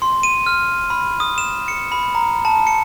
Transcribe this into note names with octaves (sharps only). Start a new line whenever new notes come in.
C6
D#7
F6
B5
D#6
E7
C#7
B5
A#5
A5
C#7